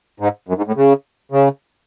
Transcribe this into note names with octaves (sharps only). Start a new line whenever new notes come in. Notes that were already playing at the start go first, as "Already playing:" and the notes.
G#2
F#2
G#2
A2
C#3
C#3